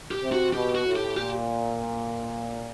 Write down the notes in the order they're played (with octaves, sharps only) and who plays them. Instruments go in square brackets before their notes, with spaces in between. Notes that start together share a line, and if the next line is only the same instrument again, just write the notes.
[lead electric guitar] G4
[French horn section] C3
[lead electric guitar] F#4
[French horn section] B2 [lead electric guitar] G4
[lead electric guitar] F#4
[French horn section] A2
[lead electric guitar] G4
[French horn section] A#2 [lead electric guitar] G4